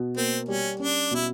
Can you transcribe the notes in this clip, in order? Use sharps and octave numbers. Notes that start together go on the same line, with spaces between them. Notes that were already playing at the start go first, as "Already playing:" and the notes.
Already playing: B2
A#3 C4
G3 C#4
C#4 D4
B2 E4